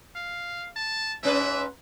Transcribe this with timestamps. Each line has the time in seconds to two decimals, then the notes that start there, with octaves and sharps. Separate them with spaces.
0.15 F5
0.76 A5
1.23 G#2 C#4 B4 E5